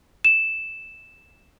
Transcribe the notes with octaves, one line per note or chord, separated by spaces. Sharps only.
E7